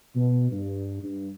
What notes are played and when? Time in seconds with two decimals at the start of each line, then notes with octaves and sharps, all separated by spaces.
0.15 B2
0.51 G2
1.03 G2